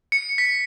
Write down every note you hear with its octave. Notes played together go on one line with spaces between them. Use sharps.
C#7
B6